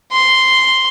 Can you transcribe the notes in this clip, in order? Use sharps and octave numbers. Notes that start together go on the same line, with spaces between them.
C6